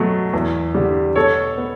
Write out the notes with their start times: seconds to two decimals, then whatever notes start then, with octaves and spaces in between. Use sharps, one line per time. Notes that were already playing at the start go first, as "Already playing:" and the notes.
Already playing: B2 F#3 A3
0.33 E2
0.75 D3 G3
1.16 B2 A4 C#5
1.58 B3